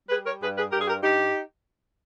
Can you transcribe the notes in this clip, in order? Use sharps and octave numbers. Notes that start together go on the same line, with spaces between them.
G3 G#4 B4
A#4 C#5
G2 G#4 B4
G#4 B4
G2 G4 A#4
G#4
G4 A#4
G2 D#4 G4